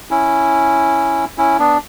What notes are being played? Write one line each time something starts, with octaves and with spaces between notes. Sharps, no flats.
C#4 E4
C#4 E4
B3 D4